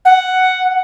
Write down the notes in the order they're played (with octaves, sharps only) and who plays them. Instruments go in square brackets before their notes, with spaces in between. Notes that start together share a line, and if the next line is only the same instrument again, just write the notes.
[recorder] F#5